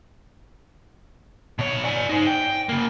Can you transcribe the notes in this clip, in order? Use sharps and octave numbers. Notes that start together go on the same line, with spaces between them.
B2 C#5
D5 G#5
D#4 C5
G5
C#3 A#3